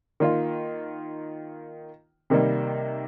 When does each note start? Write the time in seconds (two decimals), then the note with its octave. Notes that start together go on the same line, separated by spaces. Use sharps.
0.20 D#3 A#3 F4
2.30 C3 D#3 G3 A#3